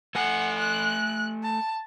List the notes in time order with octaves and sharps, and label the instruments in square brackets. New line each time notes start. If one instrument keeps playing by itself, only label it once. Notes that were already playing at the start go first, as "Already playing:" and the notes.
[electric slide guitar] A3 A4 G#5 [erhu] F#5
[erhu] F#6
A5